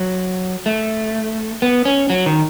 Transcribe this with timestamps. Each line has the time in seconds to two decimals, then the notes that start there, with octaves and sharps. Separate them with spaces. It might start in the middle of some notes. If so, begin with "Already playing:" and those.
Already playing: F#3
0.66 A3
1.62 B3
1.85 C#4
2.10 F#3
2.26 D#3